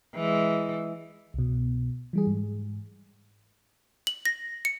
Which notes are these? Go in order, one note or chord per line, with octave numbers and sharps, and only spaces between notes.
E3 G#3
C2 B2
E3 G3 G#4
G#2
F#7
A#6
C#7